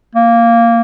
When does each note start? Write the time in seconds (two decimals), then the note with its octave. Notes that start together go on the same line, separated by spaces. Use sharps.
0.15 A#3